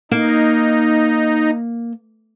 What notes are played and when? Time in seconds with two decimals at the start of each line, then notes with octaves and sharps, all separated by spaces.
0.11 A#3 D#4